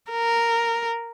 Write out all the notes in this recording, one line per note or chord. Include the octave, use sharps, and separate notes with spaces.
A#4